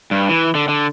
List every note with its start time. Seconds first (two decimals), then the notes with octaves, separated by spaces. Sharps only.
0.11 G2
0.29 E3
0.55 D3
0.69 D3